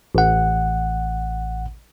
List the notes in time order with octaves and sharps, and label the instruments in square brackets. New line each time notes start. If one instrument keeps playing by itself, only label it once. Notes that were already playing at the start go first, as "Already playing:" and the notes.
[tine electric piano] A1 F#5